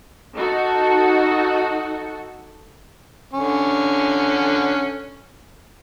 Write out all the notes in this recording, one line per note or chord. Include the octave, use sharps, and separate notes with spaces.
D#4 F#4 A4
D3 C#4